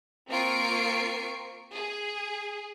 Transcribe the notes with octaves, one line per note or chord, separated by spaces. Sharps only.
A#3 C4 F4 C#6 C7 D7
G#4